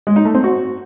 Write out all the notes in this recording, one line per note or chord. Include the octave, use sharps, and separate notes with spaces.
G#3
D#4
A3
C4
F#4